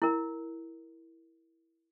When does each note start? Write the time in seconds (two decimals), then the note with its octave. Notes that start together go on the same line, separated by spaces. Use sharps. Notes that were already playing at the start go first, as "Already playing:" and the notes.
0.02 E4 A#4